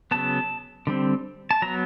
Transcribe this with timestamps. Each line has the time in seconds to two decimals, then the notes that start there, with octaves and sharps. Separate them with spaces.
0.11 C#3 F#3 B3 A5
0.87 D3 G3 C4
1.51 A5
1.62 F#3 B3 A#5